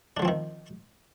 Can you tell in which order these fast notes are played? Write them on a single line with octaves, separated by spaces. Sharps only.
D4 D3 F3 C4 D#3